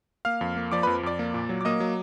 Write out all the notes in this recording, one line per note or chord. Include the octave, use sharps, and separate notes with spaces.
A#3 F5 F6
F2
A#3
F3 D5 D6
F2 B4 B5
F2 D5 D6
A#3
A#2
F#3
D6
A#3 D#5 D#6
F#3